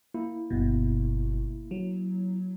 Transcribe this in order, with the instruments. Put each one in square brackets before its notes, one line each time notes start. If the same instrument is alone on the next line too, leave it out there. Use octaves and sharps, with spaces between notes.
[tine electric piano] A#3 E4
[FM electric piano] G1 B2
F#3